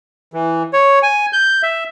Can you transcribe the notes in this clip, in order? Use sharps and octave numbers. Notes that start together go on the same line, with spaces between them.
E3
C#5
G#5
G6
E5